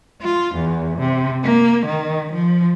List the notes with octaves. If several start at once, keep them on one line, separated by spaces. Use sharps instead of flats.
F4
E2
C3
A#3
D#3
F3